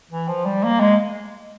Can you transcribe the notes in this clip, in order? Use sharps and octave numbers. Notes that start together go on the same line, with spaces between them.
E3
F3
G3
A#3
G#3